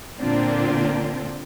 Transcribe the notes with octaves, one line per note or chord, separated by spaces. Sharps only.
A#2 D3 A#3 C4 D4 F4